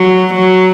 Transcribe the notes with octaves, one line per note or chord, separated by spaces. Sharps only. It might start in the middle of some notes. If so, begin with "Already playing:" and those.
Already playing: F#3
F#3